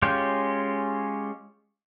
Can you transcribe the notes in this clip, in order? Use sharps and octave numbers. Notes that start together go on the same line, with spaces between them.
G#3 C#4 F4 G4 G6